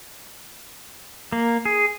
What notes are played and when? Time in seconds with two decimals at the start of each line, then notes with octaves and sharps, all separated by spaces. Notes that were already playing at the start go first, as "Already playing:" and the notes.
1.32 A#3
1.65 G#4